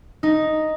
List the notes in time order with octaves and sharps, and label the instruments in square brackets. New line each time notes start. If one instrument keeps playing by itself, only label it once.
[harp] D#4